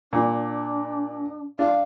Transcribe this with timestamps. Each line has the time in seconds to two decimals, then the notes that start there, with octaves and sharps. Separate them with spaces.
0.13 A#2 D4
1.59 D4 F5